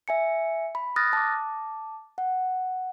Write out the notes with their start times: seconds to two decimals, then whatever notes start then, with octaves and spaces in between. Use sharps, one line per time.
0.08 E5 G#5 C#7
0.75 B5
0.96 D#6 F6 F#6 A6 A#6
1.13 A5 D6
2.18 F#5